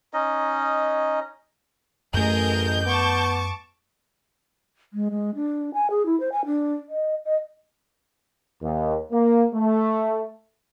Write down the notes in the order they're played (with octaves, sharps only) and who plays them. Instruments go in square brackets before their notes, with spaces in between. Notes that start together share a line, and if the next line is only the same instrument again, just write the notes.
[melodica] C#4 D#4 D#5
[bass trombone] A1 [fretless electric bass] F#2 A3 [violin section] G#4 A#4 D#5 [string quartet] G6
[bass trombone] B3 [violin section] A5 C#6 D6
[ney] G#3
G#3
D4
G#5
G#4
E4
C5
G#5
D4
D#5
D#5
[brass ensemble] D#2
A#3
A3